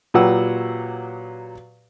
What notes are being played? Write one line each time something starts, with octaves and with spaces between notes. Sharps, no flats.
A#2 F#3 G4 B4 F#5 E6